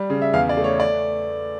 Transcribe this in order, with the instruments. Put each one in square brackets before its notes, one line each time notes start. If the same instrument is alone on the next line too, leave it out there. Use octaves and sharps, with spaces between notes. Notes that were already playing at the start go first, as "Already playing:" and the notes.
Already playing: [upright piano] G3
C#3
E5
E2 F5
D5
A3
C#5
D5